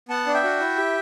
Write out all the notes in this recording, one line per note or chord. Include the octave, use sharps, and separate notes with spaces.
B3 F#5 A5
D4
E5 G5
F#4
E4
G4